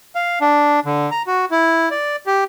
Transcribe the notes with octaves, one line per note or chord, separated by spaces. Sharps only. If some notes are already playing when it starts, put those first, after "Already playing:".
F5
D4
D3
A#5
F#4
E4
D5
G4